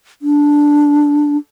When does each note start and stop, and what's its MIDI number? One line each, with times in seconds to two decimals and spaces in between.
0.22 1.37 62